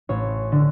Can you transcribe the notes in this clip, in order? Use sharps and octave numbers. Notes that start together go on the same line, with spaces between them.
A1 C#5
D3